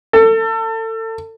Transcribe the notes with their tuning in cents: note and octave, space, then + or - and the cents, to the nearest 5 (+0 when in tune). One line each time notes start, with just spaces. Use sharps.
A4 +30